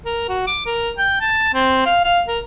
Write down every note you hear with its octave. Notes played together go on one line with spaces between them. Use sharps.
A#4
F#4
D6
A#4
G5
A5
C4
F5
F5
A#4